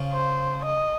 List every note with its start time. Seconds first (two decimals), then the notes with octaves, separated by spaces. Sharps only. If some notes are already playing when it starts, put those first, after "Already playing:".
Already playing: C#3 F3
0.12 C5
0.65 D#5